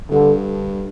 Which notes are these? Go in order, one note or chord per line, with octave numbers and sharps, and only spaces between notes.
G2 D3